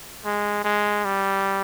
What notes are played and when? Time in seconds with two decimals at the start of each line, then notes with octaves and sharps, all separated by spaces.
0.25 G#3
0.64 G#3
1.05 G3